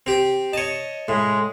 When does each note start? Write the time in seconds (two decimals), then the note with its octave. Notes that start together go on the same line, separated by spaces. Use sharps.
0.06 C4 G4
0.53 C#5 D#5 A5
1.08 A2 G#3